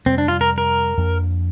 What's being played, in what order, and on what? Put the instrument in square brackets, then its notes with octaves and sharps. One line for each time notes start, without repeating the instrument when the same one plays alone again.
[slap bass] F2 C3 G3 [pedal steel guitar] C4
[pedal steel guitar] D4
F4
A#4
A#4
[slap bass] F2 F3 A#3 D4